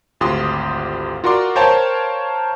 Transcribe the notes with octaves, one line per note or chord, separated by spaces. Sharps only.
G#1 D2 F4 G4 C6 D#6
F4 F#4 A#4 D5 C6 D6
A#4 C5 C#5 F5 G5 A5